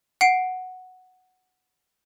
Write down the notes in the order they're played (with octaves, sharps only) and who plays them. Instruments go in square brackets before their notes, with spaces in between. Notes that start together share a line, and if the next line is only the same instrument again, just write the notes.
[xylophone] F#5 C7 D7